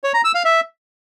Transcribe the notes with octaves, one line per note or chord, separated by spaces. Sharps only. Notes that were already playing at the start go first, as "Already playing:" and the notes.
C#5
A#5
E6
F5
E5